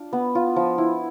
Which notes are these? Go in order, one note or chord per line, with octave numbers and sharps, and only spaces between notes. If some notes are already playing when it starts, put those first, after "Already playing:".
Already playing: D4 F4
B3
F4
F3
E4